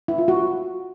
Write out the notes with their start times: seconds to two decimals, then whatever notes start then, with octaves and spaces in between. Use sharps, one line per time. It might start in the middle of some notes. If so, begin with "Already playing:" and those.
0.08 E4
0.18 F4
0.28 F#4